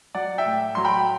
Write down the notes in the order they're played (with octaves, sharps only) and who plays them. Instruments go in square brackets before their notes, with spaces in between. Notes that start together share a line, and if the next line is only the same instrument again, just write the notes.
[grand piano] F#3 D5 F#5
E5 G5
A2
F#3 C6
G5 B5